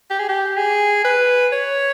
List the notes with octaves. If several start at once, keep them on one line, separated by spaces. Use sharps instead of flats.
G4
G#4
G4
G#4
B4
C#5